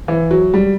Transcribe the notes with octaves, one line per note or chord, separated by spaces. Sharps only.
E3
F#3
G3